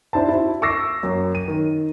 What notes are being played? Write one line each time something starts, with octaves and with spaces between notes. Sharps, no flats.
D4 E4 C5 A5
E4 F#4
C#6 D6 E6 A#6 C7
F#2
D#7
D#3